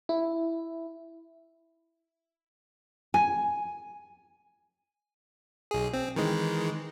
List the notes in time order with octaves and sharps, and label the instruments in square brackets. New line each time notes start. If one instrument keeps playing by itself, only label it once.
[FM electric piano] E4
[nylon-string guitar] G#5
[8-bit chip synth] B1 G#4
C4
D#3 E3 G#3